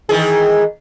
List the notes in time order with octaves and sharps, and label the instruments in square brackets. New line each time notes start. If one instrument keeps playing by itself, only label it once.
[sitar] D#3 E3 G#4